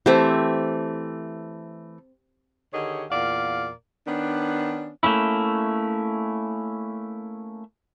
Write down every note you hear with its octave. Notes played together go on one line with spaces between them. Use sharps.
E3 A3 C4 G4
D3 D#3 G4 G#4 C#5 D#5
E2 A#2 A#4 D5 F5
D#3 B3 C#4 D4
A3 A#3 C#4 E4